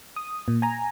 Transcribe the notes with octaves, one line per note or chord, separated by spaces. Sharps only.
D#6
A#2
G#5 A#5